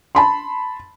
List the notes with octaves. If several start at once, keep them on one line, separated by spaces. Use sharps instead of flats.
A5 B5 C6